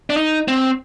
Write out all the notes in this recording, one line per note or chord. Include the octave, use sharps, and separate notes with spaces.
D4
D#4
C4